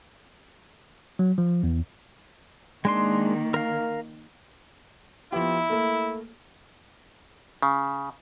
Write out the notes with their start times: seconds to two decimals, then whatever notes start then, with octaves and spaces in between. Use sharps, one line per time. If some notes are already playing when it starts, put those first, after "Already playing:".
1.19 F#3
1.38 F3
1.63 E2
2.85 D#3 G#3 A#3 D4 C6
3.54 A#4 F5
5.32 F3 B3 E4 G4
5.70 A3 A#3 A4
7.62 C#3